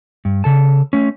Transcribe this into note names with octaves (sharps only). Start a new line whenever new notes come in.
G2
C#3 A4 A5
A3 C#4